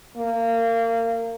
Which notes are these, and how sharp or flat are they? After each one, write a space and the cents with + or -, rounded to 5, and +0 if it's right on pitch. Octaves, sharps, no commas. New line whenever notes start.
A#3 -25